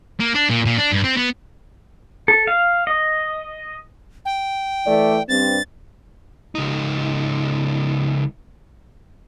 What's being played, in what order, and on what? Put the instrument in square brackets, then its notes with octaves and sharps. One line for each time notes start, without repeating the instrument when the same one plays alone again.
[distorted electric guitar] A#3
D4
A#2
A#2
D4
G2
C4
B3
[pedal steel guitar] A4
F5
D#5
[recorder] G5
[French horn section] E3 A3 D5
[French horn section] G2 C4 [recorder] A6
[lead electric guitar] C#2 D#4